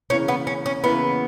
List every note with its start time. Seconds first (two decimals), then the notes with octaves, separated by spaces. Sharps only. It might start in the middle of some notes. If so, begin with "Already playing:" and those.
0.10 E2 C#3 E3 A#3 C#4 E4
0.28 B3
0.47 C#4
0.66 C#4
0.83 E2 C#3 E3 A#3 B3 E4